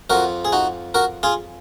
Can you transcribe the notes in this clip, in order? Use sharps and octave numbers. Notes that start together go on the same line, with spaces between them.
F2 F3 F#4 A#4
G#4
D#4 F#4
F#4 A#4
F4 G#4